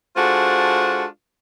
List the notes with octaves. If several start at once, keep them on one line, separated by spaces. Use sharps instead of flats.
G#3 D4 F4 F#4 A4 C5